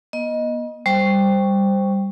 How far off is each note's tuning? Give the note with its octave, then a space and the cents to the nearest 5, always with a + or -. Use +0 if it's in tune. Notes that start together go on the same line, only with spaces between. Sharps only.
B3 -45 D#5 +0
G3 +10 C5 +0 C#6 +0